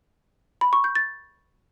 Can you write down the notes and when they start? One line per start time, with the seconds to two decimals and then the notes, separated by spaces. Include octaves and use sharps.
0.61 B5
0.73 C#6
0.84 G6
0.95 A6